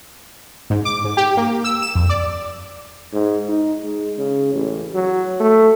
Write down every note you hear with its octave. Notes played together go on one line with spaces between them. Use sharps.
G#2
D6
G#2
G4
A#3
E6
E7
F2
D5
G#2
D#4
G#3
C#3
A1
F#3
A3